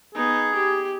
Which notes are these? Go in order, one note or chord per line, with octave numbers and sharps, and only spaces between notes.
B3 D#4 G#4
G4